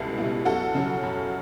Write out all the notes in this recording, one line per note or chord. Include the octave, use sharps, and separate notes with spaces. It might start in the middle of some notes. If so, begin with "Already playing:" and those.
Already playing: C#2 B2 G3 B3 E4 A4
B2 G3 B3 E4
F#2 F#4 A4
C#3 F#3
F#2